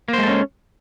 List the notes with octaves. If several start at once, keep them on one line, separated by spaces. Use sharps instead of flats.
G#3 A#3 C#4 A4 C5